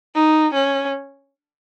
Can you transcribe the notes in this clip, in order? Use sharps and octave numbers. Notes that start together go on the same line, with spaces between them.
D#4
C#4